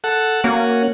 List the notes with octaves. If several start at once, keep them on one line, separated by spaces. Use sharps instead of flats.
A4 F#5
A#3 C#4 F#4